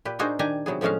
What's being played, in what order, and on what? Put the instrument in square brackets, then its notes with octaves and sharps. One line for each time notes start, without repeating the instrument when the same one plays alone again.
[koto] A#2 G4 B4
D4 D#4 F#4 G#4 A#4 C5
D#3 D4 G4 G#5 A#5
C3 F#3 B3 G#4
A2 F3 G#3 C#4 F#4 F5